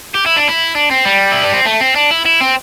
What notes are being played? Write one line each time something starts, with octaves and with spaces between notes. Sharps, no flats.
G4
E4
D4
E4
D4
C4
G3
E4
D4
C4
A3
C4
D4
E4
E4
C4